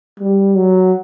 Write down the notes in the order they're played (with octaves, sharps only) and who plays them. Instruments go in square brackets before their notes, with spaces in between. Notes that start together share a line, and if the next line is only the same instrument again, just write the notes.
[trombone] G3
F#3